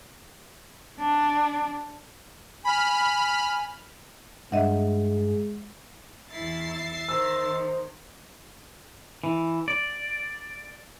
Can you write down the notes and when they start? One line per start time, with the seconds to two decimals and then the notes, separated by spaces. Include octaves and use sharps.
1.00 D4
2.65 G#5 B5 F6
4.52 G2 G#3 D#5 E5 F#5
6.31 E2 E4 E5 A6 C7
7.09 D#3 C5 E6
9.24 E3
9.68 D5